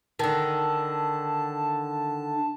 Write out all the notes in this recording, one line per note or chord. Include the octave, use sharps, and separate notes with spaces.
D3 D#3 A5